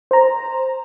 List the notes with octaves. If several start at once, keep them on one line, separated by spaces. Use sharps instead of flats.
C5 A#5